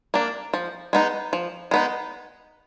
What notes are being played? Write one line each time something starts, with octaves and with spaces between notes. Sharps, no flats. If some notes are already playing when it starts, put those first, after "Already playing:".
A#3 D4
F3
G#3 B3 D#4
F3
G#3 B3 D#4